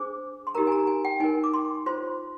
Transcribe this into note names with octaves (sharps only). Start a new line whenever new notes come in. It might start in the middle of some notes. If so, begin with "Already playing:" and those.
Already playing: D4 G#4 C5 D6
C6
D#4 G4 A#4 A#5
G#5
A#5
G#5
G5
D#4 A#4 G#5
D6
C6
F4 C5 C6